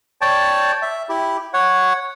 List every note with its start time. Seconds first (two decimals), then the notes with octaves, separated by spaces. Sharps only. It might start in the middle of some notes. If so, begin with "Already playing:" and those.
0.21 C#5 D5 G5 A5
0.82 E5
1.09 E4 G4
1.54 C#5 F#5